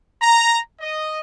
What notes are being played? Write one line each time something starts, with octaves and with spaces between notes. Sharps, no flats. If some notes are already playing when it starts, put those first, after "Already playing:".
A#5
D#5